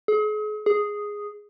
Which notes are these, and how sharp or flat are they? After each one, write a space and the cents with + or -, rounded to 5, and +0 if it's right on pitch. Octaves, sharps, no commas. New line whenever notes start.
G#4 +40
G#4 -5